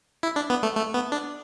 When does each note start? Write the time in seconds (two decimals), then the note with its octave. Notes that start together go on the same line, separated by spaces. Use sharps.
0.23 E4
0.36 D4
0.50 B3
0.63 A3
0.77 A3
0.94 B3
1.12 D4